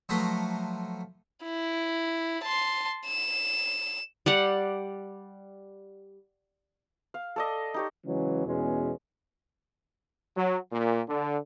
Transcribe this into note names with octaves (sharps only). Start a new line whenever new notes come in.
F3 F#3 A3 B4 A#5 C6
E4
A5 C6
E7
G3 D5 F#5
F5
A4 D5 D#5
D#4 G4 C#5
C#3 E3 F#3 G#3
E2 B2 G#3 C#4
F#3
A#2
D3